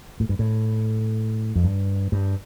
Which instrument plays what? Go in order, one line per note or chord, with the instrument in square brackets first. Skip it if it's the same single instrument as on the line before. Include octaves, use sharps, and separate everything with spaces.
[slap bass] A2
G2
A2
F2
G2
G2